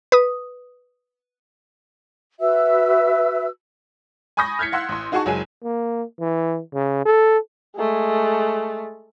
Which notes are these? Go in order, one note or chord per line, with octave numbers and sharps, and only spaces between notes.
B4 D#6
F#4 B4 E5 E6
G#5 B5 C#6 D#6 G6 A#6
F6 G6 G#6 B6 C#7
F5 F#5 C6 E6 F#6
A1 C6
D#4 F#4 G#4 F#5 A5 C#6
F#1 F#3 G#3 G#5 D#7
A#3
E3
C#3
A4
G#3 A3